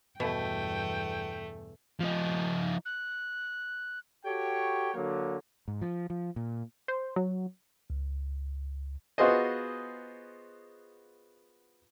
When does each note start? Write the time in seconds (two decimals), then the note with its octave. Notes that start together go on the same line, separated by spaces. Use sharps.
0.20 E2 G2 B2 A3 G5
2.00 F3 D#4
2.85 F#6
4.25 F#4 G4 A4 C#5 G5
4.95 D3 F#3 A#3
5.68 G#2
5.82 F3
6.10 F3
6.36 A#2
6.88 C5
7.16 F#3
7.90 C#2
9.18 B3 F4 F#4 G#4 C5 D#5